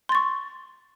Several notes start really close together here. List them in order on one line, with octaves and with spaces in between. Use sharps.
C6 A6 C#6